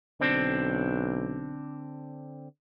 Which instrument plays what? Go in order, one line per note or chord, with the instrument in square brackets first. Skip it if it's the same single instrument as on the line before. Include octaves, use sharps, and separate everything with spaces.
[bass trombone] B1 [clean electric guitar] D3 C4 D4